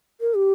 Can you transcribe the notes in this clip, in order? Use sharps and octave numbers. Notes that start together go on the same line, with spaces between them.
A#4
G4